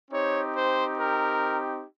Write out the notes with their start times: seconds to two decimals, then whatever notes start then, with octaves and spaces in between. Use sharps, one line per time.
0.11 C4 D#4 G4 C#5
0.55 C5
0.98 A#4